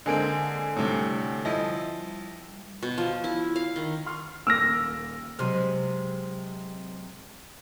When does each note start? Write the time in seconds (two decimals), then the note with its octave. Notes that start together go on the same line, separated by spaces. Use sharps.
0.06 D3 G#3 A#3 C4 G#5 D7
0.76 A2 C3 G3
1.45 F3 E4 D#5
2.83 B2
2.98 F3
3.24 E4
3.56 F5
3.76 D#3
4.06 C6 C#6 F6
4.47 D#1 A#3 E6 F6 A#6 D7
5.39 C3 F#3 G#3 C6 F6